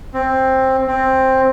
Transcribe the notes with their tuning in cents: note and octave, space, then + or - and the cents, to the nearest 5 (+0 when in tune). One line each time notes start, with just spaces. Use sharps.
C4 +10
C4 +10